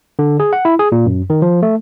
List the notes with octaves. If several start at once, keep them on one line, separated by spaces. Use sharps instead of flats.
D3
G#4
F#5
E4
G#4
A#2
F#2
D#3
F3
A3